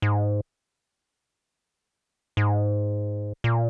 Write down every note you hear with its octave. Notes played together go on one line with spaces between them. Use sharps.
G#2
G#2
A#2